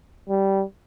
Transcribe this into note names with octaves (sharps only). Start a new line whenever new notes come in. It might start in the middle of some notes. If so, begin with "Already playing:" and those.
G3